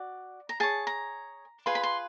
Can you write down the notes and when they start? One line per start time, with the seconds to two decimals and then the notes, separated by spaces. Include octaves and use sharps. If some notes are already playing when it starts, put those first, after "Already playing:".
Already playing: F#4 D5
0.49 A#5
0.60 G#4 C#5 A5
0.87 A#5
1.66 F4 G#4 B4 C6
1.75 B5
1.83 C6